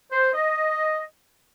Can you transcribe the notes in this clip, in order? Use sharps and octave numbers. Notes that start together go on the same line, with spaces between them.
C5
D#5